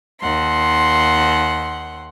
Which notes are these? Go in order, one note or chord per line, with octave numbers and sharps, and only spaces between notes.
D#2 F#5 C6